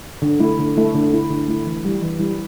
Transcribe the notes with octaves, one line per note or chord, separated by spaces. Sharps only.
D3
A3 E4
D3
A3 E4
D3
A3 E4
D3
A3 E4
E3
G3 E4
E3
G3 E4